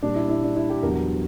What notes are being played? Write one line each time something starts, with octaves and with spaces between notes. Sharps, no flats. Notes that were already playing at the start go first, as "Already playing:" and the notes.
A#2 G3 A#3 D4
E4
E4
D4
E4
G4
E2 D3 F#3 A#4